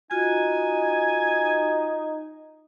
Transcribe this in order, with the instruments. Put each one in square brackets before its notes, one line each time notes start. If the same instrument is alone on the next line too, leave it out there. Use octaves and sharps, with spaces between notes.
[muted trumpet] D#4 [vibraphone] F4 F#4 [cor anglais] G#5